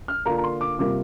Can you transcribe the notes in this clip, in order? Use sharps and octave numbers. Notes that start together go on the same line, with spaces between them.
F6
D3 A#3 D4 F4 A#5
A#5
C6
D6
C3 G3 A#3 F4 D6